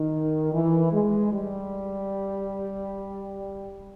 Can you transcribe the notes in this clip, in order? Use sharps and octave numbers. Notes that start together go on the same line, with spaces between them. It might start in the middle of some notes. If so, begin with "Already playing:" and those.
Already playing: D#3
E3
G#3
G3